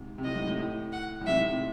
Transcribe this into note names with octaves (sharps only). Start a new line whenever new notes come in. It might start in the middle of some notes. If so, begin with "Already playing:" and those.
Already playing: G#2 C3
C3
A2 D#5
G#2
A2
A2
F#5
A2
G#2 C3 E5
A2
C3